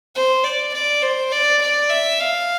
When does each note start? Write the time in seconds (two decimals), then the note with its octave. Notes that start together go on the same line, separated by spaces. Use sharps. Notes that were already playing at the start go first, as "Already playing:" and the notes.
0.15 C5
0.44 D5
0.74 D5
1.02 C5
1.32 D5
1.62 D5
1.90 E5
2.20 F5